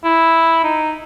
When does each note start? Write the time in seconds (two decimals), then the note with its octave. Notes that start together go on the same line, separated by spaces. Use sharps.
0.04 E4
0.64 D#4